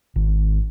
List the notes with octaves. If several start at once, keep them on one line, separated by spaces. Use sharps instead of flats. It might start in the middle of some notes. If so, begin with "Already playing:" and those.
G#1